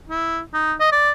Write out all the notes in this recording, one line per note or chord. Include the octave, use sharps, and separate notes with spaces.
E4
D#4
D#5
D5